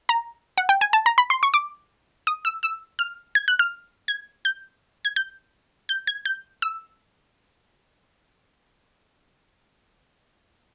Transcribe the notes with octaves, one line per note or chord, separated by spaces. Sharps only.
A#5
F#5
G5
G#5
A5
A#5
B5
C6
C#6
D6
D#6
E6
E6
F6
G#6
F#6
F6
G#6
G6
G#6
G6
G6
G#6
G6
E6